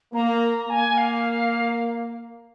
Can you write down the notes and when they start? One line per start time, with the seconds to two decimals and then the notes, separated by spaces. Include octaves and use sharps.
0.13 A#3 A#5
0.69 A#3 G#5
0.98 F5